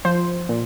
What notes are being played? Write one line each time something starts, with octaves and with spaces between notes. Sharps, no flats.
F3 C5
A#2